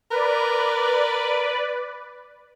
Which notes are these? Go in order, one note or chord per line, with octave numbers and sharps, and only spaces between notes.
A#4 B4 D5